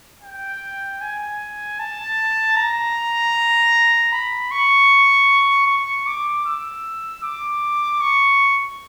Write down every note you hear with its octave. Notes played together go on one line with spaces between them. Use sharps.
G5
G#5
A5
A#5
B5
C#6
C#6
D6
E6
D6
C#6